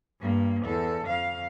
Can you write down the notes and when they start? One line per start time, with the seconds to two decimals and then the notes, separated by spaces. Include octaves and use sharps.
0.21 G2 A#3
0.64 E2 A4
1.06 F2 F5